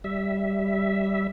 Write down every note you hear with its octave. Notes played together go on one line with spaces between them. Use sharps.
G3 E5